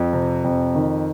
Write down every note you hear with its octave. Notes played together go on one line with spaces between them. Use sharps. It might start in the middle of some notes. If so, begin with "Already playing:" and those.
Already playing: F2
C3
F2
D#3